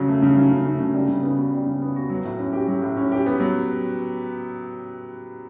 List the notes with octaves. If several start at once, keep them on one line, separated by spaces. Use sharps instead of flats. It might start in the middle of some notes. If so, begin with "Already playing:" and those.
Already playing: C#3 F#3
A3
C#3
F#3
C#3
A3
C#3
G3
C#3
B3
F#4
G3
C#3
B3
F#4
F#3
A2
C#4
G4
F#3
A2
C#4
G4
B3
F#3